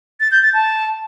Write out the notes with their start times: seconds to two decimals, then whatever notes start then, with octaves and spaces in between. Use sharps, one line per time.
0.20 A6
0.31 G6
0.42 A6
0.54 A5